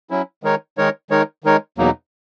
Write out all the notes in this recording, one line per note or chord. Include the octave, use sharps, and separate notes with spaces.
F#3 C#4 E4
D#3 G#3 D#4 A#4 C#5
D#3 G#3 D#4 A#4 C#5
D#3 G#3 D#4 A#4 C#5
D#3 G#3 D#4 A#4 C#5
E2 B2 F#3 A#3 D#4